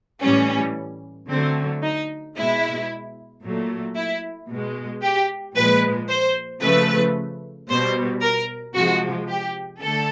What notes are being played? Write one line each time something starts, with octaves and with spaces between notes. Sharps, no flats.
A2 E3 G3 C#4
D3 F#3 A3 C4
D#4
B2 G#3 E4
A#2 F#3 A3
E4
B2
G#3
G4
A#2 F3 G#3 B4
C5
C#3 F3 A3 B4
B2 G3 C5
A#4
C3 F3 G#3 F#4
G4
D3 A3 A4